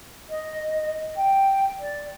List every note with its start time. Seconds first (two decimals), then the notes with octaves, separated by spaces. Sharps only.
0.29 D#5
1.15 G5
1.79 D5